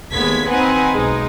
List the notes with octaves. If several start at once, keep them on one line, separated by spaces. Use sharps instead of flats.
D#2 G#3 A3 B3 G#6 B6
C4 D#4 B4 F#5 G#5
B1 G#3 D#4 G#4